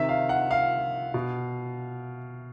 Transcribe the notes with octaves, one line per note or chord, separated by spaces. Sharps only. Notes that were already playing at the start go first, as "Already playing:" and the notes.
Already playing: C3 D#3 E5
F5
F#5
F5
B2